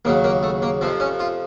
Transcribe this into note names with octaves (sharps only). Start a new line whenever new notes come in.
D#2 C#3 F#3 A#3
A#3
A3
A#3
F2 C3 F3 C4
C#4
F4